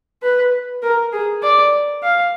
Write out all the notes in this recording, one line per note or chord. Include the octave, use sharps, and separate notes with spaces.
B4
A#4
G#4
D5
F5